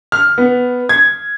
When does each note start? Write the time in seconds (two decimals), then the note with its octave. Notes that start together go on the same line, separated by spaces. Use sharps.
0.12 F6
0.38 B3
0.89 G#6